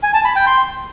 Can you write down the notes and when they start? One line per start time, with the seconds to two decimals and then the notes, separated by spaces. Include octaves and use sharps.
0.03 G#5
0.14 A5
0.25 B5
0.36 G5
0.47 C6